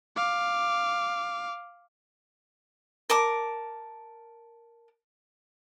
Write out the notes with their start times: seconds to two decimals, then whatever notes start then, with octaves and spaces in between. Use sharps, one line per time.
0.16 F5 D6
3.10 A#4 A5 D6